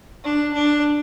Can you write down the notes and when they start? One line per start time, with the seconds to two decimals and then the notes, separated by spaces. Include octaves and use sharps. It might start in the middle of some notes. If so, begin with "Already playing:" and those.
0.24 D4
0.54 D4